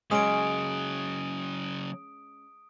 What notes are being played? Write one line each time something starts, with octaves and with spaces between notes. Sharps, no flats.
C#3 F#3 G#3 C#4 D#6 D7